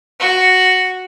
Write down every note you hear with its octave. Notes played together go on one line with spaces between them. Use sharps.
F#4